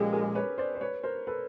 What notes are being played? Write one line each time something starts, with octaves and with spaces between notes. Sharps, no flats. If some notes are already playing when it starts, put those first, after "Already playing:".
Already playing: A#2 F3 G#3 C#4 G4 A4
G#4 A#4
B4 C#5
C5 D5
C5
B4 C#5
A#4 C5
A4 B4